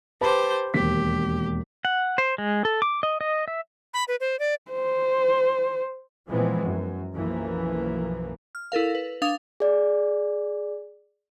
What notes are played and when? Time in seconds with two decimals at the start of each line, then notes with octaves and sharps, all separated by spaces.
0.21 G4 B4 C5 A5 B5
0.74 E1 D#2 G4 B6
1.85 F#5
2.18 C5
2.38 G#3
2.65 A4
2.82 D6
3.03 D#5
3.21 D#5
3.48 E5
3.94 B5
4.08 B4
4.20 C5
4.39 D5
4.72 C5
6.28 A#2 E3 F3 G#3 B3 C4
6.62 F#2
7.13 B1 F#2 E3 F3 A#3
8.55 F6
8.72 E4 A4 A#4 F5
8.95 B4
9.22 D4 F5 D#6 F7
9.60 G#4 D5